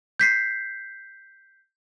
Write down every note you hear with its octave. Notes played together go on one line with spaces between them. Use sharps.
G6 B6 C7